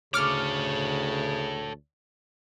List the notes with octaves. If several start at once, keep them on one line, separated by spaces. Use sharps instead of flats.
D2 C#3 A4 C#5 D6 F6